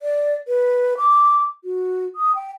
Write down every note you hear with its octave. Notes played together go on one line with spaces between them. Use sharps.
D5
B4
D6
F#4
D#6
G5